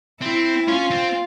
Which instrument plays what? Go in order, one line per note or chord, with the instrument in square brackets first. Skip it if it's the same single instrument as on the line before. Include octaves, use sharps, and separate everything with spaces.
[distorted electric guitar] C4 [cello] E4
[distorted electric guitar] C#4 [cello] F4
[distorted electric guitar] C4